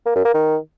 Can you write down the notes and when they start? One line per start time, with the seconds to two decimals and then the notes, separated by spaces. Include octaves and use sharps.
0.06 A#3
0.15 F#2
0.25 A#3
0.34 D#3